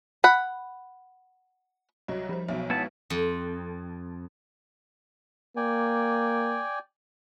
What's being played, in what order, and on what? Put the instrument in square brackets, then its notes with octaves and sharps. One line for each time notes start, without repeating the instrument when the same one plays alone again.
[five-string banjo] F#5 B5
[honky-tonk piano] C2 F#3 [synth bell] C#5 D#5
[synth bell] F3 C5 [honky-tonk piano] G3
[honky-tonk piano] B1 B2 F#3 [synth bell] E5
[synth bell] G#3 B4 [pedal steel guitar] B3 E4 A5
[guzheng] F2
[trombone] A#3 [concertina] D5 G5 G#5